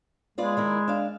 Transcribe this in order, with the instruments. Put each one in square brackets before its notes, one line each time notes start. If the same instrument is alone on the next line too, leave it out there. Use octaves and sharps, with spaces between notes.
[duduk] G#3 [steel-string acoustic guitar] B3 F4 D5
[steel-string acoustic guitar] D#3 E4 A#4
D4 F5